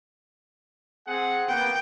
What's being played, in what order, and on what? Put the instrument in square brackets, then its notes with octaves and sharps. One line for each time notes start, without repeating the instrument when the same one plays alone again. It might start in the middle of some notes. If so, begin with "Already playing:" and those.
[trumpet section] C4 G#4 F#5
[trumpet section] A#3 B3 [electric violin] G5